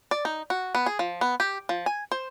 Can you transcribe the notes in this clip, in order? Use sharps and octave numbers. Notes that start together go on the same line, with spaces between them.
D5
D#4
F#4
B3
G#4
F3
B3
G4
F3
G#5
C5